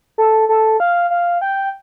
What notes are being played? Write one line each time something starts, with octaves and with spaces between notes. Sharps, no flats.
A4
A4
F5
F5
G5